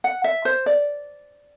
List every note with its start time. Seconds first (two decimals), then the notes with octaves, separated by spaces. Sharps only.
0.04 F#5
0.24 E5
0.45 C5
0.66 D5